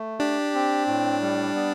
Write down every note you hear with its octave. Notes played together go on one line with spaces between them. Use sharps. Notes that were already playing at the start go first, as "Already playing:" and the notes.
Already playing: A3
D4 G4
C4
A2
G3
B3